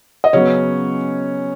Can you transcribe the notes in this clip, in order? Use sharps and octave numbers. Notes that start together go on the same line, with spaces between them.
D#5
C#3 F#3 B3 C#4 C#5